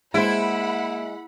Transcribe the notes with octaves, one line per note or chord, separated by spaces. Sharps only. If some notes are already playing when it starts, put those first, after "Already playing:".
G#3 A#3 E4 C5 E5 F#5 B5 D7